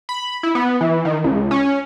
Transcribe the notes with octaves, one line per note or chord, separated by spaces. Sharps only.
B5
E4
B3
E3
D#3
C#2
C#4